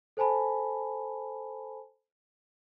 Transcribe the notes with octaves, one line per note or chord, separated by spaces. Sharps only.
A4 C5 G#5 A5 B5